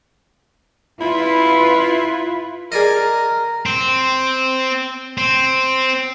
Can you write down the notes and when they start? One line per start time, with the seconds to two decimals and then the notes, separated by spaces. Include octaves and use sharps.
1.01 E4 F4 B4
2.72 G#4 A#4 D5 D#5
3.66 C4
5.18 C4